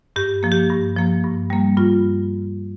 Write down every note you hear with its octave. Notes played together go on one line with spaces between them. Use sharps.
G2 G4
F3 A#3
G4
G2
F3 A#3
G2
G3 A#3
G2 F4